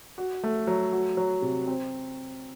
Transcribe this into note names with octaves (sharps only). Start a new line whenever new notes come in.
F#4
A3
F#3
F#4
F#3
C3
C4